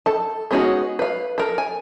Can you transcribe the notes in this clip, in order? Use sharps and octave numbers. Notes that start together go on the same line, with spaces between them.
A4 A5
G#3 B3 C#4 D#4 F#4
B4 F5
A4 A#4
G#5